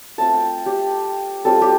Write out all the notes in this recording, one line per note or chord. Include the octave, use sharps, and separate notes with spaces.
A3 C4 F4 A5
G5
G4
G3 C4 F4 A4
G4